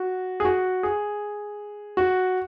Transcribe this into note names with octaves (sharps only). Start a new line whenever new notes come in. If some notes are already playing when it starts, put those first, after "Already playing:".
Already playing: F#4
G#4
F#4
G#4
F#4